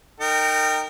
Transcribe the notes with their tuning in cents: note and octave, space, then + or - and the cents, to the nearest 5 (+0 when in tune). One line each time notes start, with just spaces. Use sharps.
D#4 -20 A#4 -25 G5 +0